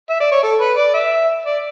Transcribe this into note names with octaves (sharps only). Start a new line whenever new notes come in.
E5
D5
C#5
A4
B4
D5
E5
D5